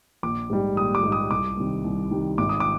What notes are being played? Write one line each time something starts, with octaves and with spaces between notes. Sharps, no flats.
A#1 D6
G#2 G3
A#1 D#6
D6
G#2 G3
D#6
C2 D6
C3 D#3 G3
C2
C3 D#3 G3
G#1 D6
D#6
D6